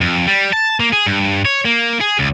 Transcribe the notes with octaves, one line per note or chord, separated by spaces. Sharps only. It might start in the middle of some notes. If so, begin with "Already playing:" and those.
F2
G3
A5
A#3
G#4
G2
C#5
A#3
G#4
C#2